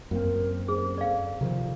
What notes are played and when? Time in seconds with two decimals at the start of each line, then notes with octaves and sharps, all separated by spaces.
0.11 F#2 A#3 C4 A#4
0.68 G#4 C5
0.98 A4 D5 F5
1.41 C3 D#3 F3